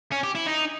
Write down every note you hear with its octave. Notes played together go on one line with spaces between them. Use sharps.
C#4
G4
E4
D#4